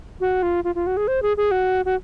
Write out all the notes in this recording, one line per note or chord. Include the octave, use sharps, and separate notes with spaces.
F#4
F4
F4
F4
F#4
G#4
C5
G#4
G#4
F#4
F#4